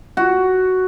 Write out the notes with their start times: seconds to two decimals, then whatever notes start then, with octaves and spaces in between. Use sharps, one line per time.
0.17 F#4